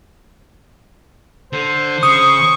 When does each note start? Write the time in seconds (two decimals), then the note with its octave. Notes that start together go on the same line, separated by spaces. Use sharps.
1.53 D3 C5
2.03 C#3 C#6 D#6